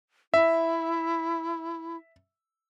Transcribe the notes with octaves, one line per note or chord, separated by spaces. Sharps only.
E4 E5